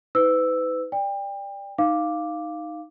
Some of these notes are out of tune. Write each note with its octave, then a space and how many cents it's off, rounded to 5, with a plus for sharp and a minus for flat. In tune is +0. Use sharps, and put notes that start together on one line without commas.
D#4 +45 B4 +35 E6 +0
D5 +0 G5 +30
D#4 +0 F5 +0 D6 +0